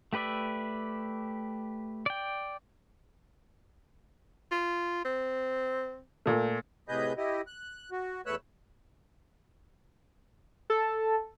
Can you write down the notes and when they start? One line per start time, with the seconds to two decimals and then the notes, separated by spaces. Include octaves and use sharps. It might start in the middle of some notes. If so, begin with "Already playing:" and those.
0.13 A3 G4 B4 D5 E5
2.06 D5 G5
4.51 F4
5.05 C4
6.26 A#2 A3
6.89 A2 C3 G#4 B4 D#5 G6
7.17 E4 G4 D#5
7.47 F#6
7.91 F#4
8.26 E2 A3 B4 C#5 E6 F#6
10.70 A4